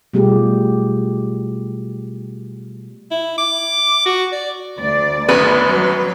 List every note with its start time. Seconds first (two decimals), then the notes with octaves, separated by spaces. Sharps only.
0.13 B2 G3 A3 F4 G4 G#4
3.11 E4
3.38 D6
4.05 F#4
4.32 D5
4.78 D2 D5
5.29 G#1 F#2 B3 B4
5.68 F#3